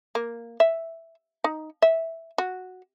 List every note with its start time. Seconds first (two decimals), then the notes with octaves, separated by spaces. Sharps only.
0.15 A#3
0.60 E5
1.44 D#4
1.82 E5
2.38 F#4